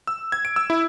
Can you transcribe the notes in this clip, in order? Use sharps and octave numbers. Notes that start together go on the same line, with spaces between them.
E6
G#6
D7
E6
E4